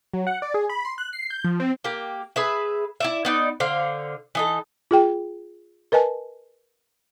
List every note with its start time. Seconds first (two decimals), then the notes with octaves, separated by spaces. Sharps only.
0.14 F#3
0.27 F#5
0.42 D5
0.54 G#4
0.69 B5
0.85 C6
0.98 F#6
1.13 C7
1.30 G6
1.45 F3
1.60 C4
1.84 A#3 G4
2.36 G#4 B4 E5
3.00 E4 D5 E5
3.25 B3 D#4 D5
3.60 D3 C5 F5
4.35 E3 D#4 A4
4.91 F4 G#4 G5
5.92 A#4 B4 D#5 G#5 A5